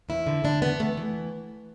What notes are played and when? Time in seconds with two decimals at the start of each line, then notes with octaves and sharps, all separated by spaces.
0.09 E2 E4
0.27 D3
0.44 D3 D4
0.62 E2 B3
0.79 E3 A3
0.97 E3